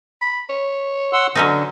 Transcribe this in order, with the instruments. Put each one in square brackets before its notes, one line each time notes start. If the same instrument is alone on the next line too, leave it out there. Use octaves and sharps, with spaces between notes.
[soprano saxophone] B5
C#5
[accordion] F#5 C6 E6
[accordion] D3 [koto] F#3 C#4 D#4